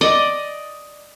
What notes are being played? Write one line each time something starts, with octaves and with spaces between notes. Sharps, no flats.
D5 D#5